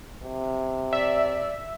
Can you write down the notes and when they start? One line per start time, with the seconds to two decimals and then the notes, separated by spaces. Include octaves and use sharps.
0.24 C3
0.93 D5 E5